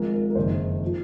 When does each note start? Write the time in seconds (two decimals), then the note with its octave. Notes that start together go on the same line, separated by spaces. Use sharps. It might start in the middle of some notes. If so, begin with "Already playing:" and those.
Already playing: G#1 G#2 F3 A#4
0.14 A#4
0.30 A#4
0.35 F#1 F2 D#3 C5
0.85 F3